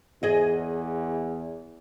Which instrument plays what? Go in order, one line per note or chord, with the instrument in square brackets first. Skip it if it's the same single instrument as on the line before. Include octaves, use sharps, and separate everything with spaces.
[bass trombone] E2 [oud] G#4 D#5